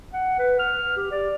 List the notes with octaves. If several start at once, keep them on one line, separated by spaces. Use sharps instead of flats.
F#5
B4
F6
G4
D5